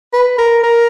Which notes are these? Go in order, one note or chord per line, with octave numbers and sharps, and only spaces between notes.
B4
A#4
A#4